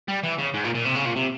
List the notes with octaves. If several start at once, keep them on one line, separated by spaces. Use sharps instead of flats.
G3
E3
C#3
G#2
A#2
A#2
C3
C#3
A#2
C3